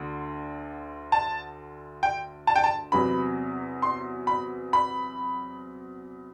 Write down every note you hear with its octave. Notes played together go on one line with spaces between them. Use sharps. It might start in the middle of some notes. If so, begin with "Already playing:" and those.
Already playing: D2 D3
A5
G5
A5
G5
A5
E2 C3 F#3 B3 B5
C6
B5
B5